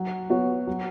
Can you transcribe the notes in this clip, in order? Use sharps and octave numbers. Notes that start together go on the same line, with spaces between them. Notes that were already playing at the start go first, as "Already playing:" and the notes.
Already playing: F#3
B3 F#4 C#5
F#3